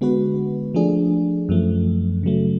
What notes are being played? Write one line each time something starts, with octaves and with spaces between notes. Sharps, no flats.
D3 G#3 B3 F#4 B4
F3 A3 D4 G#4
F#2 F3 A3
C#3 F#3 A3